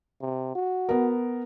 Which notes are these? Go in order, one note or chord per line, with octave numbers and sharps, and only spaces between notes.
C3
F#4
B3 A#4